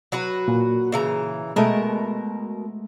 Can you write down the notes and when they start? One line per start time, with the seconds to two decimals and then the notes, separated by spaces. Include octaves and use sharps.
0.12 F#3 F#4 B4
0.48 A#2
0.92 C#3 E3 A#5
1.56 B2 G#3 A3 A#4 A5